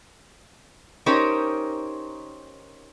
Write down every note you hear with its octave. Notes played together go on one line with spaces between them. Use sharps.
C#4 D#4 G4 A#4 C5 C#5